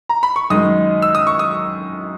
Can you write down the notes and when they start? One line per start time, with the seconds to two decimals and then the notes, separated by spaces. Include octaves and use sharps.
0.09 A#5
0.23 B5
0.36 C#6
0.50 F#2 D#3 G#3 D#6
1.02 E6
1.15 D#6
1.27 C#6
1.39 D#6